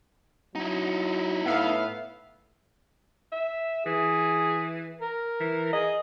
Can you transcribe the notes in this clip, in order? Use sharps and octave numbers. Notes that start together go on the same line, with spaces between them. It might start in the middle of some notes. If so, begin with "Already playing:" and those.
F#3 D#4 E4
A2 B3 E5 F5
E5
E3 G#4
A#4
E3
G#4 D#5